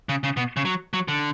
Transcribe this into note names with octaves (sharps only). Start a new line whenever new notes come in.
C#3
C#3
B2
C#3
F#3
F#3
D3